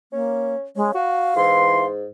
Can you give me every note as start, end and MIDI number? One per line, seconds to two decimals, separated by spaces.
0.12 0.55 58
0.12 0.65 61
0.76 0.91 56
0.76 0.91 61
0.94 1.34 66
0.94 1.86 77
1.36 2.06 44
1.36 1.84 52
1.36 1.84 84